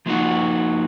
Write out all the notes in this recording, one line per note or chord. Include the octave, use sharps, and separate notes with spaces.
F3 A#3 D#4 F4 F#4